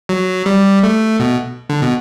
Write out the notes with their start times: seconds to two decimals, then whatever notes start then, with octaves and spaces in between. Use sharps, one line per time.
0.09 F#3
0.46 G3
0.83 A3
1.20 B2
1.70 D3
1.82 B2